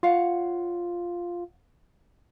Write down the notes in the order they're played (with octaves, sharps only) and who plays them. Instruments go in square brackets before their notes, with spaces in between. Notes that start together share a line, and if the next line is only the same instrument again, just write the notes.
[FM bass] F4 [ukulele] C#5 F5 F#5